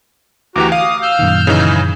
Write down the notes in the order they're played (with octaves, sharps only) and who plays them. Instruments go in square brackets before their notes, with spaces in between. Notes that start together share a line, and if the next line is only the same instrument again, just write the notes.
[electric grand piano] D2 E3 G4 [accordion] F#4 A#5 [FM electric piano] D6
[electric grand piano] F5 [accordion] D#6
[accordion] E6 F6 G6
[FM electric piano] F#2 A#2 D#3
[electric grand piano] C#3 E3 D#4